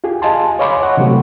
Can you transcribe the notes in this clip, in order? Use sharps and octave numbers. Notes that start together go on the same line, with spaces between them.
F4 G4 G#4
D#5 F5 G#5 A5 C6
C#5 D#5 F5 B5 C6 D6
C#5 F#5 C#6
C3 E3 F#3 A3 C4 G4